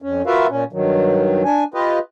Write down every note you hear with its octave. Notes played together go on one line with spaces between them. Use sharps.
F2 C#4
F4 F#4 A#4 B4 E5 F5
A#2 C#4
G2 D#3 F#3
D4 G#5
F4 G4 B4 D#5